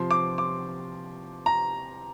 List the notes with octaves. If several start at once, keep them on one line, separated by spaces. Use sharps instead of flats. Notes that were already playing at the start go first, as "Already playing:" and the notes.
Already playing: C3 F3 C6
D6
D6
A#5